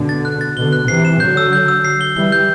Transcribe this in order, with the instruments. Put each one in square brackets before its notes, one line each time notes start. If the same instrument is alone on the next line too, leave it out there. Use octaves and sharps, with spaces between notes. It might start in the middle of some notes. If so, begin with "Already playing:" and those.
Already playing: [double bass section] B2 D3
[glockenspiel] A6
F#6
A6
[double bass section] B2 D3 [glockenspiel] G7
[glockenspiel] F#6
[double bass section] C3 E3 [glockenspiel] C7
[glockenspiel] E7
[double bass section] D3 F#3 [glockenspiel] G6
[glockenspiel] E6
G6
E6
C7
G7
[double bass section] E3 G3 [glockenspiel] G7
[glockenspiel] G6